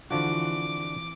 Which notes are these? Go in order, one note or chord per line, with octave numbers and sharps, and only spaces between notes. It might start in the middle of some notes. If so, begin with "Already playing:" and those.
D3 E3 F3 C4 D4 F4 F#4 D6